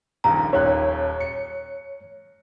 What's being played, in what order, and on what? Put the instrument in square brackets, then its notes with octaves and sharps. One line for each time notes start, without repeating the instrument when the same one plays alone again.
[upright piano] D#1 A#1 D#2 [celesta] A#5
[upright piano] D#1 D#2 F#6 [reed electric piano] C#5
[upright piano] C#7